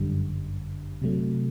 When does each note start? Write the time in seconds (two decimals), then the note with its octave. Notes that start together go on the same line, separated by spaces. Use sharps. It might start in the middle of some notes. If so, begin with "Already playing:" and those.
Already playing: G1 F#2 D3 G3
1.02 C3 F#3 A3